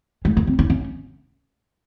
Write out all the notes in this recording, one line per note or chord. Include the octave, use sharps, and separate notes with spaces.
G#3
A#3
C4
C#4
C#4